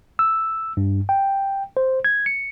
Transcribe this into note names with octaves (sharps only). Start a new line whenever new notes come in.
E6
G2
G5
C5
G#6
C#7